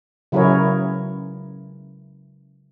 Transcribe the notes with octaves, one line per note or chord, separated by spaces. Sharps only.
C#3 F#3 E4 G#4 A#4 C#5